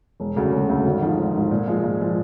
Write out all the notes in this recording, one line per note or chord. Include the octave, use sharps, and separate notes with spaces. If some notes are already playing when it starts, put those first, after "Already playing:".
E1
D2 C#3 F#3
E1
D2 C#3 F#3
G#1
G#2 F3
G#1
G#2 F3
A#2
F3 G#3
A#2
F3 G#3